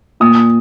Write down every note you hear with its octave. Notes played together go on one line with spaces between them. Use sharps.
A#2 D#6